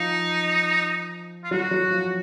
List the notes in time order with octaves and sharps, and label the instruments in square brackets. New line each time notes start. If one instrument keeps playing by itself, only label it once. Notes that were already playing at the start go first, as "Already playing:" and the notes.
Already playing: [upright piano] F3 [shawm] D#4
[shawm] F4
[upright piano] F#3 [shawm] F#4
[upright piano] F#3
F3